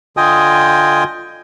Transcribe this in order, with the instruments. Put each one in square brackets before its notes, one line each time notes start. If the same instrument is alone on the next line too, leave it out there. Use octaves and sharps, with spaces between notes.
[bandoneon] D3 F4 D#5 G5 G#5 D#6